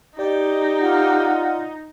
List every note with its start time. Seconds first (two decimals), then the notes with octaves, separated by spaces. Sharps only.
0.19 D#4 G4 D5 D#5
0.80 F4 F#5